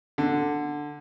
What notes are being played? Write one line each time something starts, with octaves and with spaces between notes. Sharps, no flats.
D3